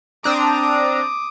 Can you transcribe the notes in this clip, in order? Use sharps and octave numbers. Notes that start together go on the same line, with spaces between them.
C4 D4 A#5 D6 D#6